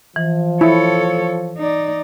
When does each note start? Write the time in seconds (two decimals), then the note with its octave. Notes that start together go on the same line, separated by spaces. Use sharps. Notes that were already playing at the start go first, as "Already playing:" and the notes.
0.16 E3 F3
0.61 E4 A4 C#5
1.58 D#4 D5